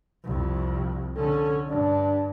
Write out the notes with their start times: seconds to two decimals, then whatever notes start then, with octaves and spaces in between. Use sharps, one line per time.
0.24 C2 F2
1.16 D3 C#4 A4
1.69 G2 D4